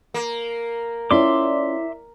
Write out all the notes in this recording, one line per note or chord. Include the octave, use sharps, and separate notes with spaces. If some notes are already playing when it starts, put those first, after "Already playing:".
A#3
C#4 E4 F4 D5 E5 C6 D6